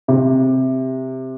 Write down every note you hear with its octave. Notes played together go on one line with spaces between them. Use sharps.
C3